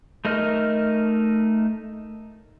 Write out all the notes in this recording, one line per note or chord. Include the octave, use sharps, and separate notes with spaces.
A3 D#4 A#4 D#5 F6